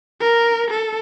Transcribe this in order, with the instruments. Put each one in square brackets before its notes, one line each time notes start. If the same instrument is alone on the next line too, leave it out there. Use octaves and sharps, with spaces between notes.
[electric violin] A#4
A4